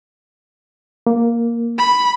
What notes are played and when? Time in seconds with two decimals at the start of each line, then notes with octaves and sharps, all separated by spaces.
1.07 A#3
1.78 B5